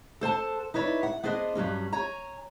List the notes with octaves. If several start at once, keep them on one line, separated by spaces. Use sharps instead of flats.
A4 C5 F#5 A5
D#4 E4 B4 C#5 D5
F#5
B3 D4 G#4 C5 D#5
G2 F#3 G3 C#4
C#5 G#5 A#5